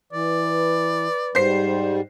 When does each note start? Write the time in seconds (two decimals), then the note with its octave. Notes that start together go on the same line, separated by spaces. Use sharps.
0.13 E3 B4 D5
1.35 G#2 G3 C5 C7